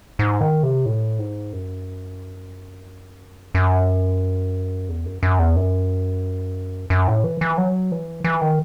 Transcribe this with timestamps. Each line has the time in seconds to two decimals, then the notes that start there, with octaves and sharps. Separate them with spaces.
0.19 G#2
0.41 D#3
0.63 C3
0.86 A2
1.19 G#2
1.53 F#2
3.55 F#2
4.89 E2
5.06 F#2
5.23 F#2
5.39 E2
5.56 F#2
6.90 F#2
7.08 A2
7.24 E3
7.41 E3
7.58 F#3
7.92 E3
8.24 E3
8.42 D#3